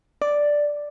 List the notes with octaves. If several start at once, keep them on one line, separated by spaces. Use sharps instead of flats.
D5